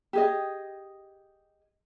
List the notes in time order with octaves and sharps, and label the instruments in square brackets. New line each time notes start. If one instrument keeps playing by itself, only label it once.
[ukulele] G4 G#4 D#5